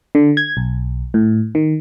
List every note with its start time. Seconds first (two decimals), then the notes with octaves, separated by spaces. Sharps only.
0.15 D3
0.37 G#6
0.57 B1
1.14 A2
1.55 D#3